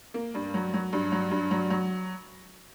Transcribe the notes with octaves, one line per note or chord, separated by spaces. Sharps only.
A#3
G2
F#3
F#3
G2
F#3
G2
F#3
F#3